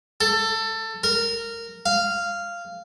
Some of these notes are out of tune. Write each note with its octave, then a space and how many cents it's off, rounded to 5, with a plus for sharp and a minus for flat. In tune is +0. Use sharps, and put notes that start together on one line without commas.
A4 +20
A#4 -15
F5 -10